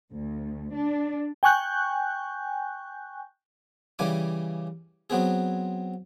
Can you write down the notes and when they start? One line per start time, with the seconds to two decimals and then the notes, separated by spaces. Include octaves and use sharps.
0.13 D2
0.75 D4
1.43 G5 G#5 C#6 F#6 G6
3.99 C#3 E3 G3 G#5 D6
5.10 F#3 B3 C4 G#4